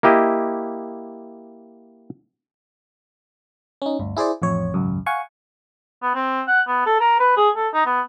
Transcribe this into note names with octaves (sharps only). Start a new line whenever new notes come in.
A#3 E4 G4 D#5
C#4 D#4
G1 D2
E4 G#4 C5 D5
A1 F2 C#5
G#1 C#2 F#2
F5 F#5 G#5 C#6
B3
C4
F#5
B3
A4
A#4
B4
G#4
A4
D#4
B3